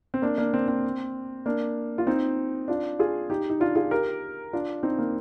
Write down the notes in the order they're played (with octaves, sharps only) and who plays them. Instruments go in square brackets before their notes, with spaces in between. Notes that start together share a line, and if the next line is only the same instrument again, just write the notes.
[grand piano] C4
A#3 D4
A#3 D4
C4
C4
A#3 D4
F4
C4 D#4
D4 F4
F4 G#4
D#4 G4
D#4
D4 F4
F4 G#4
G4 A#4
D4 F4
C4 D#4
A#3